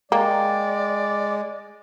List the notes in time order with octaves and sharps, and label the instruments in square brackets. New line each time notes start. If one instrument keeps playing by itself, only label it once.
[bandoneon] G#3 [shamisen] A#3 [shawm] D5 [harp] G5